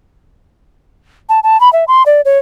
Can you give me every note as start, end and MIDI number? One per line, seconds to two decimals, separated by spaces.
1.29 1.40 81
1.44 1.60 81
1.61 1.71 83
1.73 1.84 76
1.88 2.03 84
2.06 2.21 74
2.25 2.38 73